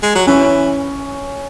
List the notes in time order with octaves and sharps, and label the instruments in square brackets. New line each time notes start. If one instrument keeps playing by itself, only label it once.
[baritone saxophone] G#3
F#3
[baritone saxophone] E3 [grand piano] C#4